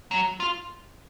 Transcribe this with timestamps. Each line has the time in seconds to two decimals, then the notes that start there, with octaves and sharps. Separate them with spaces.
0.11 F#3
0.40 F4